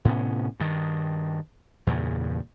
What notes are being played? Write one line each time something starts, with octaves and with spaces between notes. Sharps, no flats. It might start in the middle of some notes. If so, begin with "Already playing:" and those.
A2 C3 B3 C#4
G2 D#3
E2 G2 A#2 C#3